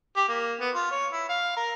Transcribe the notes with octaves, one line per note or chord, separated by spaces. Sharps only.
G4
A#3
B3
F4
C#5
E4
F5
A#4